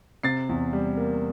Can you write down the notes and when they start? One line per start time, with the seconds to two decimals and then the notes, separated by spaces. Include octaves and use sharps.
0.23 C3 A6 C7
0.49 E2
0.73 G3
0.97 A#3